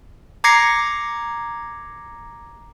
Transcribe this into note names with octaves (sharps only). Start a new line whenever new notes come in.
A#5 D6 G#6 A#6 C7 C#7